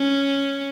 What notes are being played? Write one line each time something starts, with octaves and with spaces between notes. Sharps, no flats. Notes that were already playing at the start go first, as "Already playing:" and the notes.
Already playing: C#4